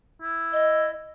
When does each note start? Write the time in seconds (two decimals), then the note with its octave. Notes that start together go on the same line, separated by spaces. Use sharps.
0.22 E4
0.52 D#5